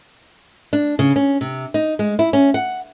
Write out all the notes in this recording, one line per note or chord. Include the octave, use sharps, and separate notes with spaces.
D4
C#3
C#4
C3
D#4
G#3
E4
C#4
F#5